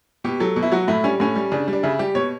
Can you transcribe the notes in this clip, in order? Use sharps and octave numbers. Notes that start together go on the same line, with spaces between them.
B2 G4
F#3 A4
B2
E4
F#3 F#4
A2 E4
G3 C#4
A2 C#4
G3
C#3 D4
G3
D4
C#3 E4
G3 G4
B2 C#5